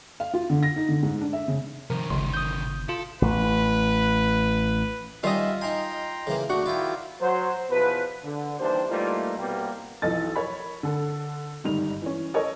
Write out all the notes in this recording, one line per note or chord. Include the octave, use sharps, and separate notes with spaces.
F5
F4
D3
A#6
D#4
D3
G#2
D4
E5
C#3
C3 D#3 F3 A#4
G1 C#2 C6
D#6 G6
F4 A4
A1 B4
D#3 G3 C#4 F4 D#5 E5
D#4 G5 G#5 A#5 C6
C#3 E3 A#3
D2 A3 D4 F#4
D#3 E4 F4 D5 G5
F#3 C5
E2 B2 F3 B4
D3
D#2 E3 G3 D4 C5
E3 G3 A3 A#3 D#4 F4
C2 B2 G3 A#3 B3
B1 E3 F3 A4 D#5 A6
A#4 C#5 B5
D3 A4
G1 G#2 D#3 G3 D#4 F7
E3 C#4
A4 A#4 C#5 D#5